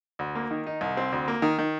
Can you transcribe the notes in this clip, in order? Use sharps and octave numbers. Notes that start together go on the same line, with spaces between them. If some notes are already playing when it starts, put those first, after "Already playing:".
D2
A#3
D#3
D#4
C2
C4
D2
A#3
D#3
D#3